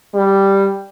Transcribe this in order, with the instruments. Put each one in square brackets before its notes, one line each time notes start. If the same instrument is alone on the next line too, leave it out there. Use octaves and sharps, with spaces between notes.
[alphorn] G3